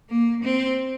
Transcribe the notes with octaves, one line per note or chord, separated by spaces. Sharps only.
A#3
C4